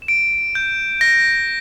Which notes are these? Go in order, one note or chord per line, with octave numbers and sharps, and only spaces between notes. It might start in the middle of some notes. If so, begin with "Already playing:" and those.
E7
D7
G6
A#6